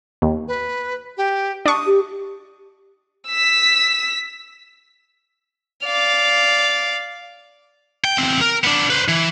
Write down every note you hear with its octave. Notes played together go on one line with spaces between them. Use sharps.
D#2
B4
G4
D4 C#6 D#6
G4
E6 B6
D5 F5
G5
E2 C4
A#4
B3 D4
B4 C5
E3